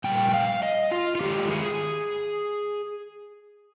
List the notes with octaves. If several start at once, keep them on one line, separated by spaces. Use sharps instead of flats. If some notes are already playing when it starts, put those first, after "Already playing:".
A#2 G3 A#3 G5
G5
F5
D#5
F4
F4
D#3 G#3 G4
G#4